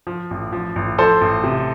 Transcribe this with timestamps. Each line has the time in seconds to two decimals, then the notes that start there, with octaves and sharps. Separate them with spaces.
0.07 F3
0.31 A1
0.52 F3
0.76 A1
0.98 F3 A4 C5
1.21 A1
1.43 C3